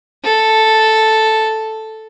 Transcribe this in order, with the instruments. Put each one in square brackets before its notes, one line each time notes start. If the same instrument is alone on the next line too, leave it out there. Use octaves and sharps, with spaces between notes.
[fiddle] A4